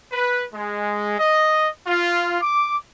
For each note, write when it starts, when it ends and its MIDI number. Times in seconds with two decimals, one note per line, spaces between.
0.12 0.44 71
0.54 1.18 56
1.19 1.68 75
1.87 2.37 65
2.41 2.77 86